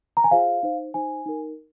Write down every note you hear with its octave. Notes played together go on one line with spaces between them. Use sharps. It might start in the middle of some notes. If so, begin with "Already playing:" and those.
A#5
G#5
F4 G#4 C5 F5
D#4 C5
D#4 C5 G#5
D#4 A#4